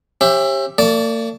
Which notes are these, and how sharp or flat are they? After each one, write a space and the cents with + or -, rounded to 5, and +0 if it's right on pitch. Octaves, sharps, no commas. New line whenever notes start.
C#4 -40 G4 +0 E5 +20
A#3 -45 D5 -10 A5 +0